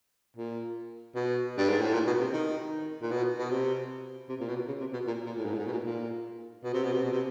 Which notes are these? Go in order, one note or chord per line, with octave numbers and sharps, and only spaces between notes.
A#2
B2
G2
G#2
A2
A#2
B2
C3
D#3
A#2
B2
B2
C3
C3
A#2
B2
C#3
C3
B2
A#2
A#2
A2
G#2
A2
G#2
B2
A#2
A#2
B2
C3
B2
C3
B2
C3